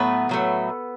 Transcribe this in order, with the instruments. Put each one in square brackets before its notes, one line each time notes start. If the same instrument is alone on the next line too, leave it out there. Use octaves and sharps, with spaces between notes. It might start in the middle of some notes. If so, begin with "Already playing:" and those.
Already playing: [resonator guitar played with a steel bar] A2 F#3 A3 B3 B4
A2 F#3 A3